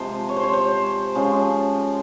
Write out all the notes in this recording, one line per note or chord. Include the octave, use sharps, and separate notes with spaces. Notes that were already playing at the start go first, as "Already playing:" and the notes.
Already playing: C3 F3 G#3 C5
C#5
C5
C#5
C5
C#3 F3 G#3